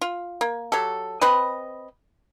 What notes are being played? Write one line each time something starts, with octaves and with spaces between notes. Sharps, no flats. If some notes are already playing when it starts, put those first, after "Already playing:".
F4
A#3
F#3 G4 A4
C4 B4 D#5 B5